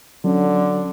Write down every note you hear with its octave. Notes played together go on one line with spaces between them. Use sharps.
D3 F#3 C#4